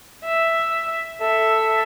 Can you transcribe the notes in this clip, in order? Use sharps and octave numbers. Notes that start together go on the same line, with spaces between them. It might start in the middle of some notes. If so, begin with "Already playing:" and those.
E5
A4 E5